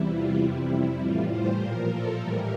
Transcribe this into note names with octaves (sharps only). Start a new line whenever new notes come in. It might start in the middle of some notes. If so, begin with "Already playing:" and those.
Already playing: E2 C3 E3 G3 E4
F4
F2 C3 G3 E4
E4
A2 E3 G3 F4
C5
A#2 F3 A#4
A4
A2 E3 G3 A#4